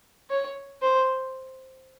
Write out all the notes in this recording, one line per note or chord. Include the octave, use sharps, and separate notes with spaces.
C#5
C5